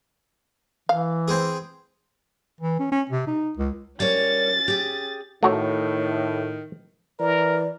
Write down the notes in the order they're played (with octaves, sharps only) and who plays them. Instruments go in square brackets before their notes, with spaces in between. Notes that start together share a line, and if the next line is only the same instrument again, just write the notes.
[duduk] E3 [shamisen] F5
[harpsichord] C4 G#4
[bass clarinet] E3
C#4
C#4
C3
D#4
C#2
[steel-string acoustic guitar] G3 A#4 C#5 [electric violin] C#4 A6
[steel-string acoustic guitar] G4 G#4
[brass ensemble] A2 [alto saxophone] D#3 [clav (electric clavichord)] A3 F#4 C#5
[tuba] E3 [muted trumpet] A#4 [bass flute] D5